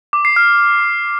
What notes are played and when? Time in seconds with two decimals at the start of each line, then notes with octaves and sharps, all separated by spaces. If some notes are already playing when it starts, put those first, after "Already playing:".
0.13 D6
0.25 C7
0.36 F6